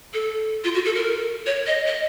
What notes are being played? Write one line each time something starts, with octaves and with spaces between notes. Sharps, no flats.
A4
F4
F#4
A4
A#4
C#5
D#5
D#5